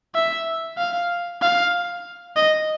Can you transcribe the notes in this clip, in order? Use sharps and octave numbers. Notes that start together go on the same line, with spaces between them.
E5
F5
F5
D#5